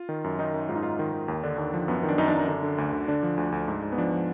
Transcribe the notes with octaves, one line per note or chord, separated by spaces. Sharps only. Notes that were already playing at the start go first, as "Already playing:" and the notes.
Already playing: F4
D#3
F#2
D#3 D#4
F#2
G#2 F4
D#4
G#2 F4
D#3
D#3
D#2
D3 D4
D#2
F3
F#2 B3
B3
D#3
D4
F#2 D#4
D4
F#2 D#4
D3 D4
D3
D2
D3
D3 D4
F3
D2
D2
G#2
G#2
B3
F3 D4
F3